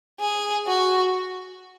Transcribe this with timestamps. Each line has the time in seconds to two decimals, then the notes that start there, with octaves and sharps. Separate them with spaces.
0.20 G#4
0.67 F#4